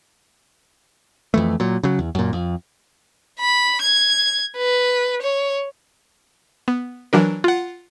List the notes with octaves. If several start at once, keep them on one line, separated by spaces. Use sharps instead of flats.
F2 E3 A3
A#2 F#3
C#3 F#3
E2
F#2 A#2
F2
B5
G#6
B4
C#5
B3
E3 F#3 D4 A#4
F4 F#5